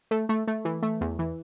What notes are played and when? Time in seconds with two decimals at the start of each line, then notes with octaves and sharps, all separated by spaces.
0.11 A3
0.29 A3
0.47 A3
0.65 E3
0.82 A3
1.01 E2
1.19 E3